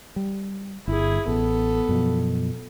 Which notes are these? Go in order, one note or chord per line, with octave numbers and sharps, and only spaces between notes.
G3
G1 E4 G#4
A1 B3 A4
F#2 B2 F3